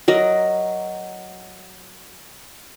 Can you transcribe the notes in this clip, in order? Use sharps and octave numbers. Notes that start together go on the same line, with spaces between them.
F#3 A#4 D#5